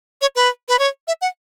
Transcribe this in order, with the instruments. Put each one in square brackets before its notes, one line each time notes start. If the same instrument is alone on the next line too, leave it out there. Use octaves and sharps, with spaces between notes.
[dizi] C#5
B4
B4
C#5
E5
F#5